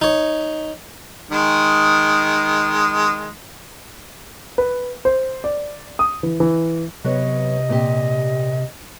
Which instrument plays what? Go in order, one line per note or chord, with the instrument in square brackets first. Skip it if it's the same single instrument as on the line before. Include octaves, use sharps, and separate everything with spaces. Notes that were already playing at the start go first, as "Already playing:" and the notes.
[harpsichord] D#4 C#5
[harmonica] D#3 G#3
[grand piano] B4
C5
D5
D#6
E3
E3
[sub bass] C3 [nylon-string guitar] F#3 B3 C#5 [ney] D#5
[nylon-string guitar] A#2 C4 G4